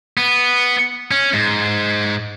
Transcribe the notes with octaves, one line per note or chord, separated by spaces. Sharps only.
B3
C#4
G#2